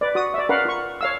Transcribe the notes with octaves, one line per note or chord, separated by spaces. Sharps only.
B4 D5
F#4 D#6
D5 E5
C#4 A#4 B4 F5 F#5
F4 C#6
C#5 F5 E6